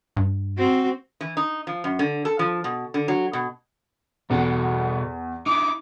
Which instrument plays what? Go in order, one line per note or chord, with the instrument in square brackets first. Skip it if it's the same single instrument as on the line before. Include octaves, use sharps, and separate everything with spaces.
[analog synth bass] G2
[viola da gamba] C4 F#4
[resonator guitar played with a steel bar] E3
D#4
F3
F#2
D3
A4
F3
B2
D3
F#3
B2
[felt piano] E2 [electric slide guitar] B2 F#4 A4
[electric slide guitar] D#4 E4 [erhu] D6